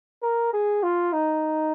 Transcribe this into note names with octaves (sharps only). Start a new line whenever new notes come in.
A#4
G#4
F4
D#4